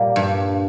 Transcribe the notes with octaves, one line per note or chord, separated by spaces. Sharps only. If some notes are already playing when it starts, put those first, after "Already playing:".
Already playing: A#2 G3 A#3
G2